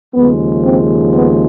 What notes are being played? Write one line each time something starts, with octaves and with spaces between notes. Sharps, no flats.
D#2 C#3 F3 G#3 B3
C4
B3